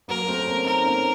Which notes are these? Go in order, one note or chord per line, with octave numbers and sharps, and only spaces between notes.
F#3 A#3 A#4
A3 C4
A#3 C#4
C4 D#4 A#4
A#3 C#4